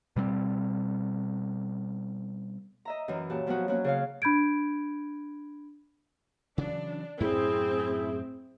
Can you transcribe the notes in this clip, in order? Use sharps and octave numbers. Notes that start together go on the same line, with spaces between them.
B2 G3 A#3 C4
D#5 E5 A#5
F#2 E3
A#2 F#4 G4 A5
F3 F#3 B3 D#4 F#4
F#3 A#3 C#4 F#4
C#3 C#5 F5
D4 B5 G6 G#6 D7
C#3 E3 F#3 D4
F#2 A2 C4 E4 G#4